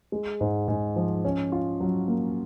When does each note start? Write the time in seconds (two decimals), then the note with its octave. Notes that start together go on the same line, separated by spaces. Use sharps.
0.12 G#3
0.41 G#2
0.68 G#2
0.96 F3
1.25 C#4
1.52 F4
1.80 F#3
2.08 A#3